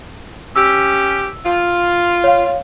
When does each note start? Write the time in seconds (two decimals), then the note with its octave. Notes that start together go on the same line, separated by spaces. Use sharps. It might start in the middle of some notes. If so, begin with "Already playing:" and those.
0.55 C#4 G4 E6
1.44 F4
2.24 C#5 F5